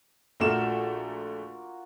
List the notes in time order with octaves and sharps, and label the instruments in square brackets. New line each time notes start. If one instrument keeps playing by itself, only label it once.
[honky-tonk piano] A#1 A3 E7 [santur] A#3 F4 F#4